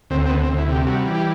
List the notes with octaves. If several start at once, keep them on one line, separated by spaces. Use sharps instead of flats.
D2 C4
C4
D2 B3
C4
D2
E4
C3 G4
G3 F#4
E3
G4